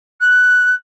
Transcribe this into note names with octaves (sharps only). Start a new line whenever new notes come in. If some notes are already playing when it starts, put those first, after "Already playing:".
F#6